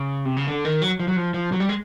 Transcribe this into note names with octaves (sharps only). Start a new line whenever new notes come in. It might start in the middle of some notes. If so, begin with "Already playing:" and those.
Already playing: C#3
C3
C#3
D3
D#3
F#3
F3
F#3
F3
F3
F#3
G3
G#3